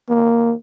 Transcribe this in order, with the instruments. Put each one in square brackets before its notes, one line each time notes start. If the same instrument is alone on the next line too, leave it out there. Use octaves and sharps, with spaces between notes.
[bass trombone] A#3